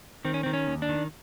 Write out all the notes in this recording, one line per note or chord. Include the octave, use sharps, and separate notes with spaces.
D#3 C4
C#4
C4
D#3
C#4
D#2
D4
D#3